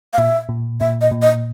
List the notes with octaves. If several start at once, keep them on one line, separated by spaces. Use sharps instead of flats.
F5
A#2 E5
A#2
A#2 E5
D#5
A#2
D#5